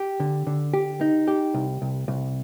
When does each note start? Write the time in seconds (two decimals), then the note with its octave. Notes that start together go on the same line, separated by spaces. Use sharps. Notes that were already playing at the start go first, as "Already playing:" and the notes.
Already playing: G4
0.20 D3
0.47 D3
0.73 G4
1.01 D#4
1.28 G4
1.54 C2
1.82 C2
2.08 C2